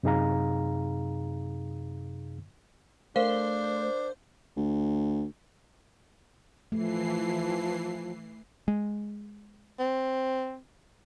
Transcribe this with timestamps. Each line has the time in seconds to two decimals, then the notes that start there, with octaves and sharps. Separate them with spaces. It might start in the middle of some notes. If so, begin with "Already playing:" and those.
0.03 F#2 C3 D#4 G#4 F5 A#5
3.16 A3 D4 A#4 C5 F5
4.56 D2
6.72 E3 F3 A3 C7
8.68 G#3
9.79 C4